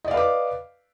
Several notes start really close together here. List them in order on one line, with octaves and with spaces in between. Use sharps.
D#5 D5 F5 B4 D6